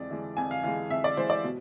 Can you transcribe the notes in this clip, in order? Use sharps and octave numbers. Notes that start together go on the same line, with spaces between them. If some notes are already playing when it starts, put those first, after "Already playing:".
Already playing: F2 E3 G#3 D5
E3 G#3
F2 G#5
F5
E3 G#3 F5
F2 E5
D5
E3 G#3 C5
D5
B2